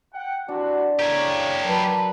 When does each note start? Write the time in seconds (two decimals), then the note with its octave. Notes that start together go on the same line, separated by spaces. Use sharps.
0.13 F#5 G5
0.48 C3 E3 D4 F#4
0.99 F#2 A2 C#3 G4 C#5 A#5
1.63 F#3 A#4 B4 A5